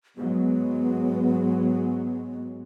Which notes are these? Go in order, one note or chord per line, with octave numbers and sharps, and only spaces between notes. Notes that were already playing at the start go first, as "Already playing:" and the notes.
G#2 F#3 G#3 B3